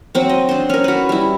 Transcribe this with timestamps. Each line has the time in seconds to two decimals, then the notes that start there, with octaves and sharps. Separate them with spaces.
0.15 F#3 C4 F#4
0.29 D#5
0.49 D4 C5
0.69 C#4 A#4
0.84 F#4 B4
1.09 G3 E4